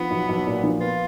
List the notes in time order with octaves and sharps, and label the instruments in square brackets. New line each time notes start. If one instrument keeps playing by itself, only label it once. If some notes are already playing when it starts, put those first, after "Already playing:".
Already playing: [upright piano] F3 [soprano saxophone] B3
[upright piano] B1
B1
A#2
F3
[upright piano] B3 [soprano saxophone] F4